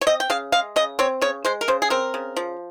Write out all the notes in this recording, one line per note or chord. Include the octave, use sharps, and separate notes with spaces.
C#5
C4 D#5
G5
C#3 F5
G#3 F5
C#3 D#5
C4 C#5
C#3 C#5
G#3 C5
A#4
C#3 C5
G#4
C4 A#4
C#3
F3